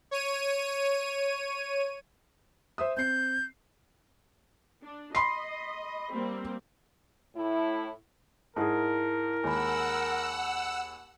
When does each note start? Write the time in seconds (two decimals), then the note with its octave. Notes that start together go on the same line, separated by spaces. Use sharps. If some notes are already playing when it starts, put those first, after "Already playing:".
0.11 C#5 D#7
2.78 C5 E5 D#6
2.97 C4 G6 C7
4.83 D4
5.15 D#5 B5 C6 C7
6.13 G3 A#3 C4
7.35 A2 E4
8.57 G#2 E4 G#4 A#4 A5
9.44 D#2 G#3 F#5 G#5 B5 E6